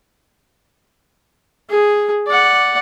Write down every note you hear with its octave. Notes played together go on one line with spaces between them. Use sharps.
G#4
D5 F#5